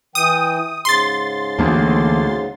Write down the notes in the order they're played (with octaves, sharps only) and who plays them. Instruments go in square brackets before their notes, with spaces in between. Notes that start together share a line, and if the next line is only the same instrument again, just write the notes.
[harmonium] E3 G5 [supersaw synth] D#6
[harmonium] G#2 C#3 [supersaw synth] C6 A6
[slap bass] D2 [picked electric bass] E3 A#3 D4